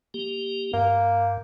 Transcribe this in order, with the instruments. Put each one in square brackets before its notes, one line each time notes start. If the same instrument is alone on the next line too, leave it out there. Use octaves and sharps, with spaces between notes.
[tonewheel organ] A#3 G4
[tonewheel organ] G2 [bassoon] A#3